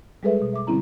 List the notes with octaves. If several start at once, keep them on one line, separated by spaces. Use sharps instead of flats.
G3 G#3 G#4 A4 B4 E5
B2
E5 D6
D3 G3 C4 C#4 E4 A#5